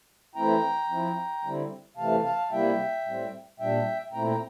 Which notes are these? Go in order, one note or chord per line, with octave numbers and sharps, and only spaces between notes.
E3 A3 C4 E4 G5 A#5
F3 C4 E4
D3 G3 C4 E4
C3 E3 A3 F5 A5
F5 A5
C3 G3 A#3 E4 E5 G5
A2 G3 C4
A#2 G3 D4 E5 G5
A#2 A3 C4 E4 G5 A#5
G5 A#5